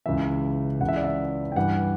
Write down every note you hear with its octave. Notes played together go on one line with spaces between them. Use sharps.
C#2 C#3 E3 E5
C#2 C#3 E3 F#5
E5
D5
E5
G5
G2 E3 F#5